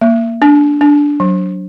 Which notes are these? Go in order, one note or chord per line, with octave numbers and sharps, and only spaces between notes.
A#3
D4
D4
F#3